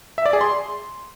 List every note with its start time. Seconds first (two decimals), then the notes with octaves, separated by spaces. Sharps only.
0.18 E5
0.26 D5
0.33 G#4
0.41 C6